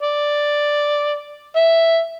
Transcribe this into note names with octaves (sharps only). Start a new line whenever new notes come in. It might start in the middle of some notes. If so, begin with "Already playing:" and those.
D5
E5